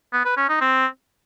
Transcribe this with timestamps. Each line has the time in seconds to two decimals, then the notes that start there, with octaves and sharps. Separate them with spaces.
0.13 B3
0.25 B4
0.37 C#4
0.49 D#4
0.61 C4